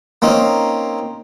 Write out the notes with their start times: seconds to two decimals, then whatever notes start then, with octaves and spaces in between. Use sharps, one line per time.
0.22 A#3 C4 C#4 D#4